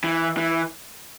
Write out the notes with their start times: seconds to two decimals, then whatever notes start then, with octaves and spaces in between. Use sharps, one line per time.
0.04 E3
0.37 E3